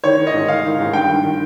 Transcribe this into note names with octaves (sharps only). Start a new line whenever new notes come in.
D#3 C#5
D#3
D#5
G#2
D#3 F5
D#3
G#2
G2 G5
D#3
D#3